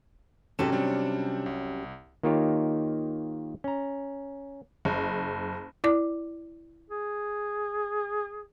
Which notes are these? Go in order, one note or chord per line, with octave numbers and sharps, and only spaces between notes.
G#2 C3 F#3 C#4 A4 E7
G3 C4 D4
C2
D#3 A#3 D#4 F4 G4 C#5
C#4 A#5
F#1
E4 D5 D6
G#4